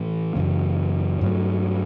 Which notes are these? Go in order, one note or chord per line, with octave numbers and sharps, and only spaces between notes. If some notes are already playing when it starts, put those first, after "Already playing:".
Already playing: A2 E3 A3
F#2 C#3 E3
G2 F#3 A3